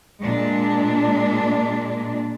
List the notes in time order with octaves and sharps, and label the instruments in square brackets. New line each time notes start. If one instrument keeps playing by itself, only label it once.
[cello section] A#2 G#3 D4